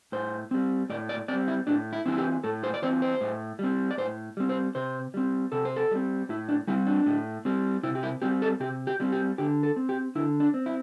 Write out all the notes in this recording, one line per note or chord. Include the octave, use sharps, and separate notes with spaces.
A2 C5
G3 C4
A2 D5
D5
G3 C4 D5
E4
A2 D4
E4
E3 C4 E4
G4
A2 A4
C5
D5
E3 C4 C5
C5
A2
G3 C4
D5
A2 C5
G3 C4
C5
C3 C5
G3 C4
C3 A4
C5
A4
G3 C4
A2 E4
D4
G3 C4 E4
D4
A2
G3 C4
C3 E4
G4
E4
G3 C4 G4
A4
C3 G4
G4
G3 C4
G4
D3 G4
A4
C4
G4
D3 E4
D4
C4
E4